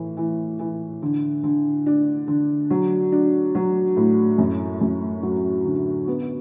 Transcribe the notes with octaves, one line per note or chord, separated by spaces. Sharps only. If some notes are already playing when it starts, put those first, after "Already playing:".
Already playing: A2 E3
E3
E3
D3
D3
D4
D3
F#3
D4
F#3
A2
F#2
F#2
F#3
D3
B3